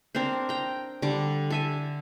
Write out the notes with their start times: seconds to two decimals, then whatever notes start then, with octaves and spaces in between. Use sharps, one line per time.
0.15 C4 D4 A#4 C5
0.49 G5 A#5
1.02 D3 G3 D6
1.50 A4 E5 G#5